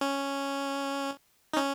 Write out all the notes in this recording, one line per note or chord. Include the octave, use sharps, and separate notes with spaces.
C#4
D#4
C#4